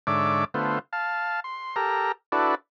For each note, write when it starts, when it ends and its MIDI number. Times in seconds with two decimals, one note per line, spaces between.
0.07 0.45 44
0.07 0.45 50
0.07 0.45 73
0.07 0.45 74
0.07 0.45 76
0.07 0.45 86
0.54 0.79 50
0.54 0.79 57
0.54 0.79 59
0.54 0.79 65
0.54 0.79 72
0.93 1.40 77
0.93 1.40 81
1.44 1.76 84
1.76 2.12 67
1.76 2.12 69
1.76 2.12 70
1.76 2.12 82
2.32 2.55 62
2.32 2.55 64
2.32 2.55 66
2.32 2.55 69
2.32 2.55 71
2.32 2.55 74